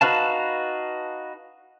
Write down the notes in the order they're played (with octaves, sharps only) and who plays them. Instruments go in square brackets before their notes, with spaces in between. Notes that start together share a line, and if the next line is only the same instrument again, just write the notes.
[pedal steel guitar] D#4 F#4 B4 F5 A5